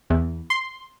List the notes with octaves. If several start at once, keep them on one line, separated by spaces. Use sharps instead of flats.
E2
C6